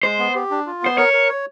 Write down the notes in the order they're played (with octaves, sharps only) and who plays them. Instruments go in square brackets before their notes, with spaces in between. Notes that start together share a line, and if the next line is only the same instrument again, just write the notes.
[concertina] G#3 [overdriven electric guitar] C5
[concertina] B3
G4
D4
F4
[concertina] B3 [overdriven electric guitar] C5
[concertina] A#4 [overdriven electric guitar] C#5
[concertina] A#4
C#5